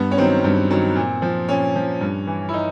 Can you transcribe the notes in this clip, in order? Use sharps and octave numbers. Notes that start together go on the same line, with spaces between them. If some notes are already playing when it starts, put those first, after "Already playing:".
Already playing: G2 B3
C#4
D#3 F#3 C4
G2
D#3 F#3
A#2
F3
A#2 C#4
F3
G2
E3
E4
D#4